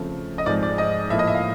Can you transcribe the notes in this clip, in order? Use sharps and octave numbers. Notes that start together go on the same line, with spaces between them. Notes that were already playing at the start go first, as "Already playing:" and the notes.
Already playing: C#3 F3 A3 C4
D#5
G#2 F3 G#3 C4 D5
D5
D#5
A2 F3 A#3 E5
D#5
E5
F5